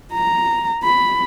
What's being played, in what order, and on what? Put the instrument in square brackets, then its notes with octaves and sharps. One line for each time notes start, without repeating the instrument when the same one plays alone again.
[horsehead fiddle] A#5
B5